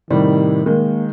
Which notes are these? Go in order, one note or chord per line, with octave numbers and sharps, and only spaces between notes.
A2 C3 D#3 G3
D#3 G#3 A#3